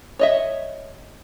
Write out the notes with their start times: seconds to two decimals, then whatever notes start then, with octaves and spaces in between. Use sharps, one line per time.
0.19 C#5 D#5 E5